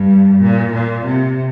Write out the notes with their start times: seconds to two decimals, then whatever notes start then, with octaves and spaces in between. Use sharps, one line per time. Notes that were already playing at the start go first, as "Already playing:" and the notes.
Already playing: G2
0.42 A#2
0.74 A#2
1.06 C3